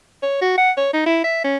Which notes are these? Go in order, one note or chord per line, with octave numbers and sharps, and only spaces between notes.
C#5
F#4
F#5
C#5
D#4
E4
E5
C#4